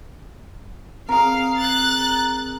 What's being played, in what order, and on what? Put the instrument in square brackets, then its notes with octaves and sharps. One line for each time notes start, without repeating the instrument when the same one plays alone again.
[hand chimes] C4 [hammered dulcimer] G#4 A#4 [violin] F5
[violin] F#6 A6